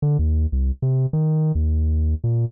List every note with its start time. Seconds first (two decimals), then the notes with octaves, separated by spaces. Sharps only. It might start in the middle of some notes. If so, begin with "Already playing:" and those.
0.02 D3
0.19 D#2
0.52 C2
0.82 C3
1.13 D#3
1.55 D#2
2.24 A#2